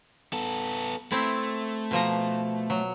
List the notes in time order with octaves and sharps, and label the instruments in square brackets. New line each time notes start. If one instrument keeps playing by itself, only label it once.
[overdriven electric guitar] B3 A4
[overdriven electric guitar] A3 [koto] C4 E4
[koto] B2 F3 A#5
F#3